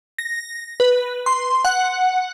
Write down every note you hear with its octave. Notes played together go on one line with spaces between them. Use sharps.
A#6
B4
C6
F#5